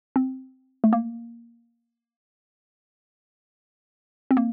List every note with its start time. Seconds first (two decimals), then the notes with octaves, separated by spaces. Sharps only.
0.16 C4
0.84 A3
0.93 A#3
4.31 C4
4.37 A#3